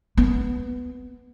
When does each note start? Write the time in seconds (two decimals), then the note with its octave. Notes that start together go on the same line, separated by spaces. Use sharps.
0.17 B3